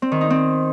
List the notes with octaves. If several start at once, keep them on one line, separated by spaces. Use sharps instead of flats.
C4
D#3
D#4
C4